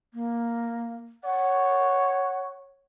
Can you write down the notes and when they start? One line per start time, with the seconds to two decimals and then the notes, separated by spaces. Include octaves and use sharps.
0.14 A#3
1.24 C#5 F#5